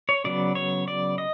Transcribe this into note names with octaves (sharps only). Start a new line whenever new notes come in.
C#5
C#3 F#3 B3 D5
C#5
D5
D#5